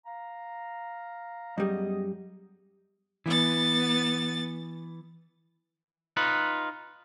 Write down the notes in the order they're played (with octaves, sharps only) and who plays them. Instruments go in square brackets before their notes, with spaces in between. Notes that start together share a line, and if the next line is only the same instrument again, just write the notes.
[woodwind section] F5 A#5
[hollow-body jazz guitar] F#2 G3 [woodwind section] B3 G#4 D#5
[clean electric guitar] E3 [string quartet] B3 A6
[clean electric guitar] D#4 F4 B4